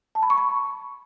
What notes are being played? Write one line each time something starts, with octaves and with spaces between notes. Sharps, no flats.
A5
B5
C#6
B5